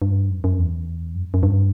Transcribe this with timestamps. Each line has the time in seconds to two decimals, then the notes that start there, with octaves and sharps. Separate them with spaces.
0.02 G2
0.30 F#2
0.44 F#2
0.59 E2
1.15 F#2
1.34 F#2
1.43 G2